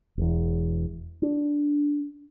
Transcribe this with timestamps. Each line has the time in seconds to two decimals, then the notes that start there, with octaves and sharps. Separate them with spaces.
0.17 E1 E2
1.22 D4